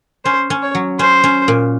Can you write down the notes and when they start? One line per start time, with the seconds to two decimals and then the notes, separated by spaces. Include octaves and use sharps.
0.25 C#4 C5
0.50 C#4
0.62 C#5
0.75 F#3
0.99 C#4 C5
1.24 C#4
1.48 A#2